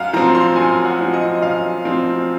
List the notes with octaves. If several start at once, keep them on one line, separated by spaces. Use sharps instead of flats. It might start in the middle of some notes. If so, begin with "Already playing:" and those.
Already playing: F#2 F5 F#5
F3 C4 A#5
C6
F#2 G#5
F#5
F3 C4
D#5
F#2 F5
F3 C4